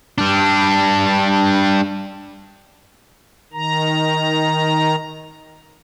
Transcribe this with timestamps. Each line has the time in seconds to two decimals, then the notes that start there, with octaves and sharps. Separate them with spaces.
0.18 G3 D4
3.53 D#3 A#5